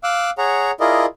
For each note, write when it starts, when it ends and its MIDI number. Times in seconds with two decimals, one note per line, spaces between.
0.04 0.30 77
0.04 0.30 86
0.04 0.30 88
0.04 0.30 90
0.38 0.71 68
0.38 0.71 73
0.38 0.71 78
0.38 0.71 82
0.80 1.06 64
0.80 1.06 65
0.80 1.06 68
0.80 1.06 70
0.80 1.06 74
0.80 1.06 75